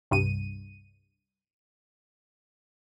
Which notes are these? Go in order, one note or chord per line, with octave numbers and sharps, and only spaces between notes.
C2 G2 D#7